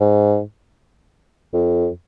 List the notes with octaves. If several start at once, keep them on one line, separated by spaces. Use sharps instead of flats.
G#2
F2